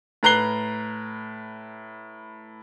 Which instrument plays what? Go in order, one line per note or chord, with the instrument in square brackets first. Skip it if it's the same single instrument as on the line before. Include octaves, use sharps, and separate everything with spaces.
[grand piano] A2 B4 A#5 F#6 C7 G7